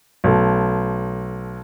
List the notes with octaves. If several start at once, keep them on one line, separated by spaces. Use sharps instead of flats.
B1 A3